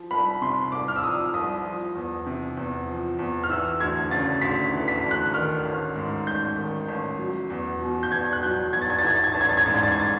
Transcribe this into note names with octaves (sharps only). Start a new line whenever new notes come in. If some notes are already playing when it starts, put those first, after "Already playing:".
Already playing: F3
C2 B5
C3 C6
C2 D6
F6
E6
F3 D#6
C2 D#6
F3
E2
C3
E2
F3
E2
F6
E3 E6
D2 G#6
C#3 A6
D2 B6
E3
B6
D2
F#6
D#3 F6
A1
G#2
A1 G6
D#3
A1
F#3
E2
B2
G6
E2 G#6
F#6
F#3 G6
E2 G#6
A6
G#6
A6
E3 G#6
A6
G#6
A1 A6
G#6
A6
G#6
G#2 A6
G#6
A6
G#6
A6